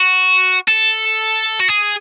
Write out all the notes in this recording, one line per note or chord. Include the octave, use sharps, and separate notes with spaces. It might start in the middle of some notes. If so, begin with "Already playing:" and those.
Already playing: F#4
A4
F#4
G#4